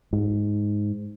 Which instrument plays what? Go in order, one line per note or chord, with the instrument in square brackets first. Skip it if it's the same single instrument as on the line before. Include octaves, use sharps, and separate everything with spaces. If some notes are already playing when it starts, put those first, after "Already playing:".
[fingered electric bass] G#2